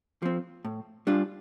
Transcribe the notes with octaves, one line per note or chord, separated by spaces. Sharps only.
F3 C4
A2
G3 D4 F4